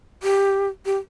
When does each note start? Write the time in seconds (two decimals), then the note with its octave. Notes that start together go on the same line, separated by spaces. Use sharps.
0.23 G4
0.86 G4